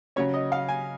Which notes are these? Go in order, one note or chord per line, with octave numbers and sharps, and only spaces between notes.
C#3 F#3 C#4 C#5
D#5
F5
G#5